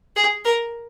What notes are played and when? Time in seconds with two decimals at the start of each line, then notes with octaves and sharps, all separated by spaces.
0.16 G#4
0.45 A#4